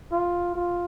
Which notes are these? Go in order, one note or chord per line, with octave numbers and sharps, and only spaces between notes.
F4
F4